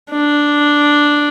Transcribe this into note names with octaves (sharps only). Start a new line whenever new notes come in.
D4